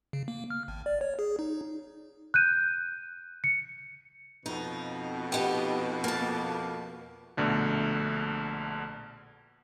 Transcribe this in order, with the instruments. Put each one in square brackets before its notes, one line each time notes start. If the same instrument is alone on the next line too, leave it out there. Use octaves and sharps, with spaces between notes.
[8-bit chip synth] C#3
A#3
F6
G#1
D5
C#5
G#4
D#4
[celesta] F#6 G6 D#7
C#7
[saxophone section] F2 B2 [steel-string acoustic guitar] D#4
[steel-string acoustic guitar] B3 D#4 G4
A#3 A5
[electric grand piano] A#1 B2 D3 A3